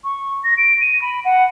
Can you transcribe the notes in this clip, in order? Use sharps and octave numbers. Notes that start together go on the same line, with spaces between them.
C#6
A#6
D7
D#7
B5
F#5